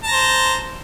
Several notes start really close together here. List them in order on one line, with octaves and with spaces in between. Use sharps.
A5 A#5 C5